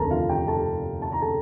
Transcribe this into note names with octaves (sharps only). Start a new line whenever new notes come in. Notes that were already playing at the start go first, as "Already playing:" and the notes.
Already playing: F1 D#2 D3 A4 A#4 A5 A#5
F4 F5
G4 G5
A4 A5
A5
A#5
A4 A5